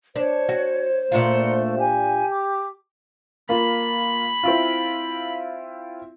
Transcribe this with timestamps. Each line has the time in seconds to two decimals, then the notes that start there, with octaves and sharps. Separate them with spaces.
0.16 D4 C5 C#5
0.49 F#4
1.12 A#2 A3 D4 F4 F#5 A#5 C6
1.77 G4 G#5
2.30 D6
3.49 A#3 F4 B5
4.43 C4 E4 F4